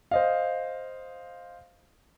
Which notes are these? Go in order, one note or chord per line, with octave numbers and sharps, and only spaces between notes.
C5 D#5 F5